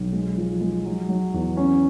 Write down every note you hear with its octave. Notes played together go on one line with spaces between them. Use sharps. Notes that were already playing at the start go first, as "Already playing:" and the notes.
Already playing: B1
G#3
F3
G#3
F#3
F#3
E2
C#4